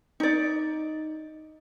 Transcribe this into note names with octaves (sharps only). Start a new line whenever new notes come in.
D#4 D5